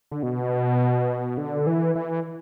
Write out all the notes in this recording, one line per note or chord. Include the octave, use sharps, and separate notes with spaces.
D3
B2
D3
E3
E3